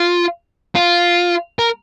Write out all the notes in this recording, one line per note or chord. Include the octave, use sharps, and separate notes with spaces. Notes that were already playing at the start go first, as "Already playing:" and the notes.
Already playing: F4
F4
A#4